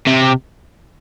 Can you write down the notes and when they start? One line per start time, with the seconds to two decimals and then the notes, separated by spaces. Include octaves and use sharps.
0.07 C3